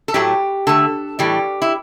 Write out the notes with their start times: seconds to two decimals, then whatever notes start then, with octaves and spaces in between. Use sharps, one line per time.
0.08 A4
0.14 A2 F#3 A3 G4
0.67 D3 A3 A4
1.19 A2 E3 G3 G4
1.62 E4